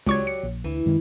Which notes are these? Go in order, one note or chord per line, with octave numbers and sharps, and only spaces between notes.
C#2 F#3 G4 D5 C#6 G#6
C#7
A#1
D2 E3
F#2 D#3 G#3